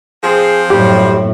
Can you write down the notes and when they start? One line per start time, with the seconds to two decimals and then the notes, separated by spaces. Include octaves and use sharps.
0.24 F3 C4 G#4
0.70 F#2 A2 G3 G4